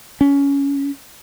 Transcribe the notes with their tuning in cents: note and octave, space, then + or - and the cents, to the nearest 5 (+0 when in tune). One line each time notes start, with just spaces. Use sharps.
C#4 +15